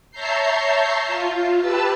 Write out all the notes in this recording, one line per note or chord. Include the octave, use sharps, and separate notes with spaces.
C#5 E5 A5 A#5 G6 C7
F4
G4 B4 A5 E6